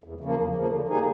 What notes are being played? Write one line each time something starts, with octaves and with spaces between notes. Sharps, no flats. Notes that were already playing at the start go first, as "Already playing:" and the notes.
E2
C#3 F3 A#3
E2
C#3 F3 A#3
D3
G3 A#3 D#4 G#4